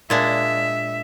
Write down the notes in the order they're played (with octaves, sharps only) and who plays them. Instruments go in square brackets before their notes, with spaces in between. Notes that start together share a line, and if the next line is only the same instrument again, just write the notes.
[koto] A#2 G#3 D4 [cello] E5